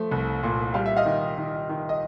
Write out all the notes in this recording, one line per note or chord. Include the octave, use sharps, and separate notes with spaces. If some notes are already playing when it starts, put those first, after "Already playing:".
Already playing: F3 A3
C2
A#2
G3 F5
E5
D#5 F5
D#3
D#3
D#3
D#5